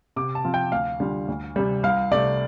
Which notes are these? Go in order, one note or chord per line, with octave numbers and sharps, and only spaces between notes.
C3 D6
A5
F3 C4 F4
G5
D2 F5
D3 G3 F4
D2
C3 G3
C2 F5
C3 A3 D5